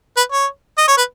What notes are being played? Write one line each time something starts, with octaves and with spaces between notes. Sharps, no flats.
B4
C#5
D#5
C#5
B4